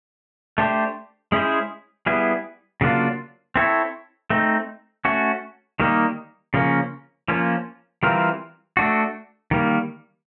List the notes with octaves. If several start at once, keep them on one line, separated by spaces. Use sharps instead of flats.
A3 D4 G4 C5
G#3 C#4 E4 G#4 C5
G3 B3 E4 G#4
C#3 F#3 A#3 D4 F4
C4 E4 A4 C#5
A3 C4 D#4
A3 C#4 F#4
D#3 G3 A#3 D#4
C#3 F3 A#3 C#4
F3 A#3 C#4 F4
E3 G3 C4 F4 A#4
A3 D4 F#4
D#3 G3 A#3